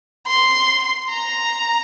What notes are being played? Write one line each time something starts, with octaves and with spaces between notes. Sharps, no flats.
C6
A#5